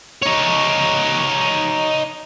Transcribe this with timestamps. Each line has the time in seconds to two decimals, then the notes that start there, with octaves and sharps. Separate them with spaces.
0.23 D#4 C#5